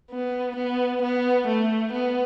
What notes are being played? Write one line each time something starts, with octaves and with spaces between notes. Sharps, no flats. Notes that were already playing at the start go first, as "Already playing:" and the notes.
B3
B3
B3
A3
B3